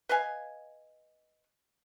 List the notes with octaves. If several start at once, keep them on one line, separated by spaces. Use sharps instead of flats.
B4 D#5 F5 G#5